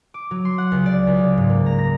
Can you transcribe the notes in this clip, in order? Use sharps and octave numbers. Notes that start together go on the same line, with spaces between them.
D6
F#3
C6
F#5
C#2
D5
C#2
G#4
G#2
A#3
A#5
A#6